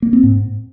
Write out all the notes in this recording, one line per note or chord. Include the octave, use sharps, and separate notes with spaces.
A#3
C4
G#2